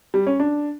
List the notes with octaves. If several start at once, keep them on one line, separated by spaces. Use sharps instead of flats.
G3
C#4
D4